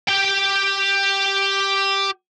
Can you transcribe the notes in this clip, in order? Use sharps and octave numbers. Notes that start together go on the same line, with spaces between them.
G4 G5